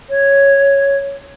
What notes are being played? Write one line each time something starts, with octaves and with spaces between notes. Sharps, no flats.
C#5